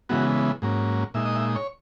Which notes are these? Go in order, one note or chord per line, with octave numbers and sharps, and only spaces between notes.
C#3 E3 G#3 B3 F#4
G#2 F#3 A#3 C#4
A#2 G#3 D#4 E5
D#5
E5
C#5